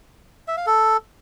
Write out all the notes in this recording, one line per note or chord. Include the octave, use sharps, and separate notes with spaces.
E5
F5
A4